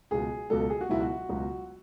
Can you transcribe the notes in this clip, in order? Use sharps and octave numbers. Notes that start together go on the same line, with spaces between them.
C#2 B2 F#3 G#4
C#2 B2 F#3 A4
G#4
F#4
C#2 B2 F#3 E4
F#4
C#2 B2 F#3